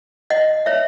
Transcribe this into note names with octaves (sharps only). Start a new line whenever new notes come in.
D#5 F#5
C#5 E5